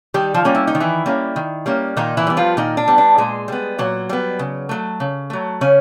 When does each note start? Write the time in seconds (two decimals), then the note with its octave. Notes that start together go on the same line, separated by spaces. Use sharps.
0.14 D#3 G3 G4
0.34 F3 F4
0.45 G3 A#3 C#4
0.55 E4
0.67 D#4
0.75 D#3
0.80 E3 E4
1.06 G3 A#3 C#4
1.36 D#3
1.66 G3 A#3 C#4
1.96 A#2 D#3 D#4
2.17 E3 E4
2.27 G3 B3
2.37 F3 F4
2.57 A#2 D#3 D#4
2.77 D4
2.88 G3 B3
2.98 D4
3.18 A#2 G#3 G#4
3.48 G3 B3
3.78 A#2 F#3 F#4
4.09 G3 B3
4.39 C#3
4.69 F#3 A3
5.00 C#3
5.30 F#3 A3
5.61 C#3 C#4